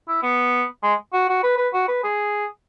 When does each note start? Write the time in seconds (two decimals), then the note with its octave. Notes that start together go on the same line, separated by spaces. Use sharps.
0.08 E4
0.23 B3
0.83 G#3
1.13 F#4
1.29 F#4
1.44 B4
1.58 B4
1.74 F#4
1.88 B4
2.04 G#4